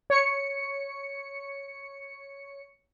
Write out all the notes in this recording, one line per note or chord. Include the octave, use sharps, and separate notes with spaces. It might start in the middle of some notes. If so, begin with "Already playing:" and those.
C#5 C#7